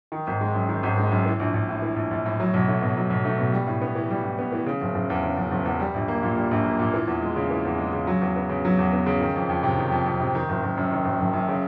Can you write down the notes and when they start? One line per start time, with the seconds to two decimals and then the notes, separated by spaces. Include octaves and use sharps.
0.12 D#3
0.27 G#1
0.41 G#3
0.54 F#2
0.69 D#3
0.83 G#1
0.98 G#3
1.11 F#2
1.26 E3
1.40 A#1
1.54 A#1
1.69 A2
1.82 E3
1.96 A#1
2.11 A#1
2.26 A2
2.40 F#3
2.54 B1
2.68 A3
2.82 B2
2.97 F#3
3.10 B1
3.25 A3
3.38 B2
3.53 G3
3.67 A2
3.82 B3
3.95 E3
4.10 G3
4.24 A2
4.39 B3
4.52 E3
4.66 C#3
4.81 F#1
4.95 F#1
5.10 E2
5.23 C#3
5.37 F#1
5.52 F#1
5.66 E2
5.80 G3
5.94 A#1
6.08 A#3
6.23 A#2
6.37 G3
6.51 A#1
6.65 A#3
6.79 A#2
6.94 E3
7.08 E2
7.22 G#3
7.36 C#3
7.51 E3
7.65 E2
7.78 G#3
7.93 C#3
8.07 F#3
8.22 E2
8.36 B3
8.49 C#3
8.65 F#3
8.79 E2
8.93 B3
9.06 C#3
9.21 D#3
9.36 F2
9.49 F2
9.63 C3
9.77 D#3
9.92 F2
10.06 F2
10.20 C3
10.35 D#3
10.49 F#1
10.63 F#1
10.77 F#2
10.91 D#3
11.05 F#1
11.20 F#1
11.33 F#2
11.48 C#3